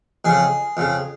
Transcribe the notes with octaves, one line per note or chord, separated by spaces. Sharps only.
F2 C#3 G#4
F2 C#3